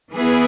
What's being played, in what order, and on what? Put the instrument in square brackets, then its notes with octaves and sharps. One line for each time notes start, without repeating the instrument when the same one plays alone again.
[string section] E3 B3 E4 G#4 B4